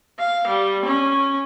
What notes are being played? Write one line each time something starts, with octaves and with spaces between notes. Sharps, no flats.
F5
G3
C#4